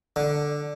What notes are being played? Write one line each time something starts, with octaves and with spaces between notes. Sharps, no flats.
D3